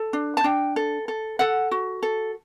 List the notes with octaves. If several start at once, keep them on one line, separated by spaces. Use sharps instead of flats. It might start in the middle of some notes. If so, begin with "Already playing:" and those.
Already playing: A4
D4
A5
D4 G5
A4
A4
A4 F#5
F#4
A4